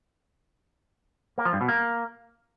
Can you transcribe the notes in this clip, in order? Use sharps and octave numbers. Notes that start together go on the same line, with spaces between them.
A#3
F3
G2
B2
A#3